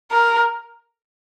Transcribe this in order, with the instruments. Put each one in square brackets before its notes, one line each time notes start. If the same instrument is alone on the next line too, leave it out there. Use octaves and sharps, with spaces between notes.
[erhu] A#4